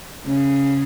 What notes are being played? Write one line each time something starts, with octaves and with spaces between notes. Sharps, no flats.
C#3